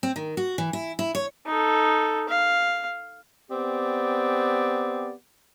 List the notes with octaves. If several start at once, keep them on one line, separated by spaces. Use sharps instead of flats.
C4
D#3
F#4
E3
E4
E4
C#5
D#4 A4
F5
B3 C4 G4 D5